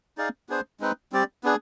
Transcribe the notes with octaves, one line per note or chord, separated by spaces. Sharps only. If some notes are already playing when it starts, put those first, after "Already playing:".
D#4 G#4 D5 F5
B3 D4 G#4 C5
G#3 C4 D#4 B4
G3 C4 G4 D5
B3 D4 G#4